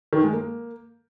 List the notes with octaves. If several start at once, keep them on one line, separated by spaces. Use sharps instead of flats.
D#3
G#3
A#3